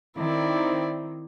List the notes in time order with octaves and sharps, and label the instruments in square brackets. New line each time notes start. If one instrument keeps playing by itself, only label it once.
[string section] D#3 C4 [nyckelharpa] E4 D5